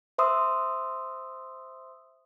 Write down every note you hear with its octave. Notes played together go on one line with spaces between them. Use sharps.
C5 E5 C6 D#6 E6